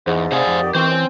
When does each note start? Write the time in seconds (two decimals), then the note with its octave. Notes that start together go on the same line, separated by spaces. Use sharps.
0.07 E2 G#2
0.32 C3 C5 D5 F5 F#5 G#5 D#6
0.47 F2
0.62 D#3 G4
0.75 E3 C4 F4 C5 C#6
0.89 C#4 G#5